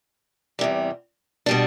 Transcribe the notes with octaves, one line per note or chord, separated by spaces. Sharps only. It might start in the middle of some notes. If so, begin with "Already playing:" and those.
E2 C3 G3
B2 G3 D4